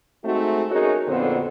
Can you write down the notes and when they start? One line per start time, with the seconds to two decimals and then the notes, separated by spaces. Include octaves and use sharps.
0.24 G#3 A3 C4 D#4 F#4
0.71 C#4 D#4 F#4 G#4 A#4 C#5
1.07 F2 A#2 D3 B3 C4 C5